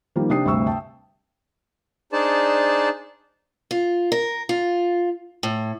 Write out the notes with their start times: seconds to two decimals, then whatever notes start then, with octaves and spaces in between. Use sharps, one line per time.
0.16 D#3 F3 G3 A#3
0.30 C3 D4 G4 G5 D#6 C7
0.45 D2 G2 C3 C#6 E6
0.66 E5 G5 A5
2.12 D4 D#4 G#4 C5 D5 A5
3.71 F4
4.12 A#4
4.49 F4
5.43 A2